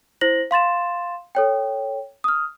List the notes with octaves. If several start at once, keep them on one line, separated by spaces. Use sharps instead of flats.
E4 C5 A#6 F#7
F5 C6 A6 E7
A4 C#5 G5
D#6 F6